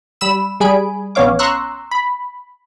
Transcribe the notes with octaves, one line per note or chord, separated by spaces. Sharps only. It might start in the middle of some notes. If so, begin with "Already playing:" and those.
G3 B5 E6 E7
G3 G#4 G#5 B5 D7
A#1 B3 C#4 C#5 F5 D6
A#5 C6 C#6 E6 F#6
B5